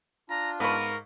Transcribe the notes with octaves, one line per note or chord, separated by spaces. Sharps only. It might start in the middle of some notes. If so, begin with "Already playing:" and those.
D4 F4 A#5
G#2 B3 A#4 B4 F5 C#6